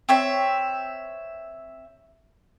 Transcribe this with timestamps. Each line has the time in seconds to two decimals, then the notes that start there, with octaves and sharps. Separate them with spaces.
0.09 C4 C#5 E5